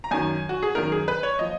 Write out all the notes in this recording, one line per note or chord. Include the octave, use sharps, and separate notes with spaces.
A#5
F#2 D#3 F#3 G#5
F#4
G#4
F#2 D#3 F#3 A#4
G#4
B4
C#5
F3 D#5